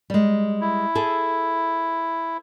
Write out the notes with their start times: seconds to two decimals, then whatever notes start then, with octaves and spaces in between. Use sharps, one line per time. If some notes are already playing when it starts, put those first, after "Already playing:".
0.10 G3 G#3
0.61 E4
0.95 G#4 A4